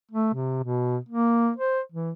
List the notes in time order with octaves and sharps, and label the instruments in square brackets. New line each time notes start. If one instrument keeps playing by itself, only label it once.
[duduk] A3
C3
B2
A#3
C5
E3